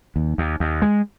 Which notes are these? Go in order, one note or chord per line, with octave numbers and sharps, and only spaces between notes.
D#2
D#2
D#2
G#3